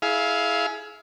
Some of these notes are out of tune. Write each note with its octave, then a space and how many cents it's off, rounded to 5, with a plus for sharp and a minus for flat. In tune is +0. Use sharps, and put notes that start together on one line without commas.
E4 -15 G#4 +20 F5 +0